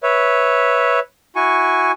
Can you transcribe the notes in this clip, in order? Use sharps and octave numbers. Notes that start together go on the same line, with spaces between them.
B4 C#5 E5
E4 F#4 G#5 C#6